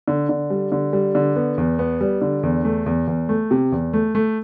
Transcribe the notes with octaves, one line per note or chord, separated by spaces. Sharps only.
D3
D3
G3
D3
G3
D3
B3
E2
B3
G3
D3
E2
A3
E2
E2
A3
C3
E2
A3
A3